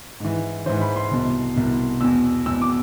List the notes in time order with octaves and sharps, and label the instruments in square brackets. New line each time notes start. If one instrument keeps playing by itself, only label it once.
[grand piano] G#2 E3
G#2 E3 C5
B5
C6
C2 B2
C2 B2
E2 B2 E6
E2 B2 E6
D6